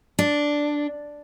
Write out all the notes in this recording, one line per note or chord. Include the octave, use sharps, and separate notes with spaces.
D4